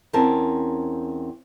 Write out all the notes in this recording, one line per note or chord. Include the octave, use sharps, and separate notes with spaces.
E2 C4 C#4 A#4 A5